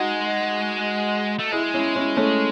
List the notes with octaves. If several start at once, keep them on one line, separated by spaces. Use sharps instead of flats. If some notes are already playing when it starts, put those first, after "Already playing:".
Already playing: G#3 D#4 F#4
A3
G#3 E4 G#4
C#4 E4
C#4 E4
A3 C#4